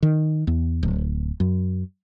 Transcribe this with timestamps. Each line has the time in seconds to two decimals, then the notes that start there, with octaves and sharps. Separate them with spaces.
0.03 D#3
0.47 E2
0.83 D1
1.40 F#2